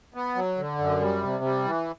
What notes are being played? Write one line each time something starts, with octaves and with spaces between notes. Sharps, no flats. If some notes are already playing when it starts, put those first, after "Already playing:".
B3
F#3
D3
F#2
G3
C3
G3
E3